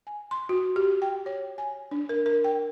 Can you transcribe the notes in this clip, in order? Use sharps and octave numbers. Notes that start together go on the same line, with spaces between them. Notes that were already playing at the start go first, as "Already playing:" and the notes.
G#5
C6
F#4
G4
G5
C#5
G#5
D4
A#4
A#4
G5